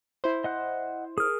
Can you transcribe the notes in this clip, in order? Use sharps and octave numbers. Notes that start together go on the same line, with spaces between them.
E4 C5
D#5 F#5 F#6
G#4 A#4 D#6 F6